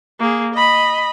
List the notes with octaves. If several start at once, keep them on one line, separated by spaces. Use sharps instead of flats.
A#3 G#4
D#5 B5